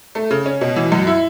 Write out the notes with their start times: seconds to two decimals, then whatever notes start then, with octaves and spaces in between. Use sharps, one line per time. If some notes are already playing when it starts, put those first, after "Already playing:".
0.15 A3
0.31 C#3
0.46 C#4
0.61 B2
0.76 E3
0.92 F#2
1.07 E4